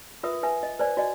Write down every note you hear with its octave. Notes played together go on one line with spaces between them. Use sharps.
F4 A#4 B4 E5 D#6
B4 E5 G#5
D#5
B4 C5 D5 G#5
F#4 D5 D#5 G#5